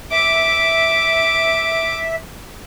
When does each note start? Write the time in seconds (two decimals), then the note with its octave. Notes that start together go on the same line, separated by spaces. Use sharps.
0.12 E5 D6